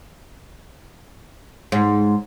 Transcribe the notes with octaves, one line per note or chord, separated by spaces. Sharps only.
G#2